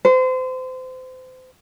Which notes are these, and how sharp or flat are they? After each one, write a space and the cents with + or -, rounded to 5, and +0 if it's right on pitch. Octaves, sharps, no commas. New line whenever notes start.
C5 -30